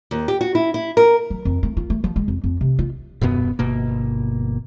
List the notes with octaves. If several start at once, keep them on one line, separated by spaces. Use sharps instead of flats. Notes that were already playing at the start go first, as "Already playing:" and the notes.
D#2
G4
F#4
E4
E4
A#4
F#3
F2
A3
F4
A3
F3
G#3
F2
F2
C3
F4
D#1 F#2 B2 B3
G1 B2 A#3